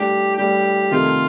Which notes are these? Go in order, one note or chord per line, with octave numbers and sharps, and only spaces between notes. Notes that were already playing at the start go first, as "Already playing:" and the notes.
Already playing: A2 G3 D4 G4
A2 G3 D4 G4
F2 C3 D#3 A3 F4